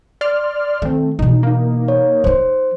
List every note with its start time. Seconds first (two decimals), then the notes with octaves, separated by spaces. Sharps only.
0.21 D5 C6 F6
0.82 D#3 A3 C4
1.19 B2 E3 D#4
1.43 A#3 D#4
1.88 C#5
2.24 F3 D#4 C5